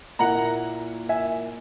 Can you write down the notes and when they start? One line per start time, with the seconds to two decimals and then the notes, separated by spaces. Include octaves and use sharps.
0.19 A#2 A#3 E4 F#5 A#5
1.09 E5 G#5